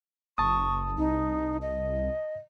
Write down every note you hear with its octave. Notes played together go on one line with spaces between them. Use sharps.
F#1 A5 C#6 D#6
C2 D#4
D#5